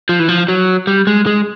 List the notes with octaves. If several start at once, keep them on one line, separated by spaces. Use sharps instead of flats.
F3
E3
F3
F#3
G3
G#3
G#3